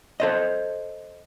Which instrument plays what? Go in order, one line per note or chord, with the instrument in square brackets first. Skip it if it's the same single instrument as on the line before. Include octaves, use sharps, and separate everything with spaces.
[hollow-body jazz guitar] A4 C5 D#5